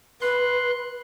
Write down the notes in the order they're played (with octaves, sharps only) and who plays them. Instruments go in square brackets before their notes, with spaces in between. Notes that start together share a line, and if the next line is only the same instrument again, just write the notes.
[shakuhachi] B4 [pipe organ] C6 F#6